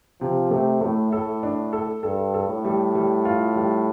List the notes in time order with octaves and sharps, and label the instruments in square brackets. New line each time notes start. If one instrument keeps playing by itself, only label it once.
[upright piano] C3 [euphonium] F3
[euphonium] C3 [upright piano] A3
[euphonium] A2 [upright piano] A3
[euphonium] A2 [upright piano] A4
[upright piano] D4
A4
[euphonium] G2 [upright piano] A4
[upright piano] A4
[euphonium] A2
[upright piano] G3
G3
F4
G3